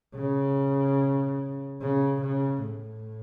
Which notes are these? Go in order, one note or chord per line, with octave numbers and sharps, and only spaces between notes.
C#3
C#3
C#3
A2